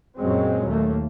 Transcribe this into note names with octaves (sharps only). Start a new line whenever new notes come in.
F#2 A#2 F#3 G#3 C4 C#4
D#2 A3 A#3